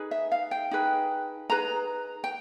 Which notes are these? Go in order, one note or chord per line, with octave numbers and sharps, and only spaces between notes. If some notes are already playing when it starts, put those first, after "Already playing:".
Already playing: D#4 G#4 B4
E5
F5
G5
D#4 G#4 B4
D#4 G#4 B4 A#5
G5